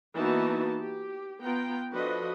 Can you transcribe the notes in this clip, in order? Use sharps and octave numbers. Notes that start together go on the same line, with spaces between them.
E3 A#3 B3 D#4 F#4 A5
G4
B3 F4 G5 A#5
F3 D4 F#4 A4 B4 D#5